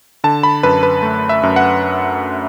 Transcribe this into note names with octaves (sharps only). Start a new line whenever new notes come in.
D3 A5
B5
F#2 B4
B4
A3
E5
F#2
F#5